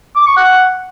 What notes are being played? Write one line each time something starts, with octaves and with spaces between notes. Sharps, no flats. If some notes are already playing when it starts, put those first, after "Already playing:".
D6
C#6
F#5